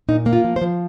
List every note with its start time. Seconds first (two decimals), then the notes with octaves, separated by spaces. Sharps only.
0.08 A#2 D#4
0.26 A#3
0.33 F4
0.44 F3
0.56 C5
0.61 F3